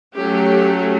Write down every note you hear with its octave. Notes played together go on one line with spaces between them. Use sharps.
F#3 A3 C#4 G4